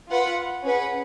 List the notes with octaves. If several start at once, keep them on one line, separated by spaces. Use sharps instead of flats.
F4 B4 F#5
C#4 G#4 B4 F#5